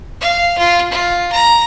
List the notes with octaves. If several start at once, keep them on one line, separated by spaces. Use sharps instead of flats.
F5
F4
F4
A#5